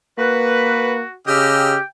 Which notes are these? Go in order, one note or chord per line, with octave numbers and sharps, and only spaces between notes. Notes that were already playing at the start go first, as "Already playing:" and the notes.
A#3 F#4 B4
C#3 G4 D#5 G5 E6 F6